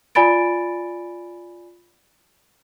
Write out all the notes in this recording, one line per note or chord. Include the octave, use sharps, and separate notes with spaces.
F4 D5 G#5 B5 A6 D7